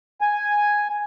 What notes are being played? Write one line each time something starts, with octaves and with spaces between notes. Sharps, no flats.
G#5